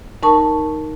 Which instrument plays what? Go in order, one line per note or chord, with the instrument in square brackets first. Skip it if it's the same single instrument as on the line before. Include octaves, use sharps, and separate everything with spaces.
[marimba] D#4 A#4 A5 C#6